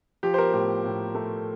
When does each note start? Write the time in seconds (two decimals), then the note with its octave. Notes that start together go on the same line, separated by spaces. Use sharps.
0.23 F3 G4
0.34 C5
0.38 A#4
0.53 A2 G4
0.85 A2
1.15 A3